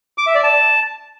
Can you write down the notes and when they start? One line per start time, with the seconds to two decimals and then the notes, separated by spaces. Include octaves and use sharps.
0.18 D6
0.26 E5
0.35 D5
0.44 A5